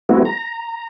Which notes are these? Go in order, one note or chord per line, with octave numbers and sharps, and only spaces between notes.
G3 A3 B3 C4 E4 F#4
A#5